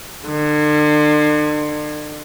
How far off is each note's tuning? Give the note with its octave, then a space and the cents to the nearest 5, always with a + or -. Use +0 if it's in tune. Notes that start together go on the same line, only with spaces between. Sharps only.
D3 +40